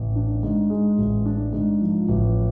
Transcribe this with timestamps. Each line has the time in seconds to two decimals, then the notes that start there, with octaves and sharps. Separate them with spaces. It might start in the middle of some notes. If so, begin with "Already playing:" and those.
Already playing: A1
0.15 D4
0.43 G#2
0.70 G#3
0.98 A1
1.26 D4
1.53 G#2
1.81 F3
2.09 A1